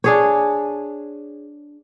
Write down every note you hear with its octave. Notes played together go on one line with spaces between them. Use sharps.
D4 G#4 C#5